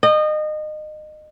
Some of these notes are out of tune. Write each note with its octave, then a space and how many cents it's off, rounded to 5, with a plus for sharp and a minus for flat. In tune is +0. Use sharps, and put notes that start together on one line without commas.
D#5 -25 G5 +20